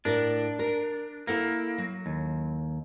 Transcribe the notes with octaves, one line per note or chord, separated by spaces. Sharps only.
A2 D4 A#4
A#4
A#3 E4 A4 F#5
F#3
D#2